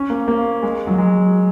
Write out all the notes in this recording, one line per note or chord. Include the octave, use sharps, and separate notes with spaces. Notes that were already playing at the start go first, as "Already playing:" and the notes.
Already playing: C#4
A#3
A#3
G#3
F#3
G#3